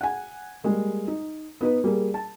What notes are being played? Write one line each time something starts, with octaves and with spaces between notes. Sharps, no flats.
F#5 G#5
G3 G#3 A#3
D#4
B3 D#4 B4
G3 A#3 G#4
A5